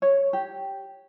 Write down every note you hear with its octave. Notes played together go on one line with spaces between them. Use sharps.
C#5
G4